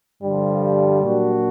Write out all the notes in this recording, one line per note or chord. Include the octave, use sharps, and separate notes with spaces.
G2 D3 F3 G3
A#2 F#3 A#3 D4 F#4